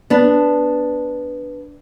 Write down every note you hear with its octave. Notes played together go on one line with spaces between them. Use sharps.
B3 D4